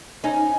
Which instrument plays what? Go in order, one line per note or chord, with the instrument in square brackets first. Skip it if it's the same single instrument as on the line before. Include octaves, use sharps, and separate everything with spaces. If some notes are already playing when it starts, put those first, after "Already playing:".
[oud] C#4 D#4 [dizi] G#5